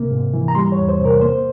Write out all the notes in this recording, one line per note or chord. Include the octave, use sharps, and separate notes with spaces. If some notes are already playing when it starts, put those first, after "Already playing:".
Already playing: C3 A#3
G#2
E3
A#5
G3 C6
C#5
E2
C5
C3
A#4
A#3 C5